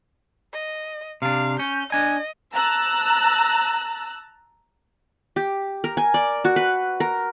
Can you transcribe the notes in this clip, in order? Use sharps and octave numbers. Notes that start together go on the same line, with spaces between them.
D#5
C3 D4 F5
C#4 G6
D4 D#5 G#5
A5 A#5 E6 F#6
G4
A#4
G#5
D5
F#4
B4
A#4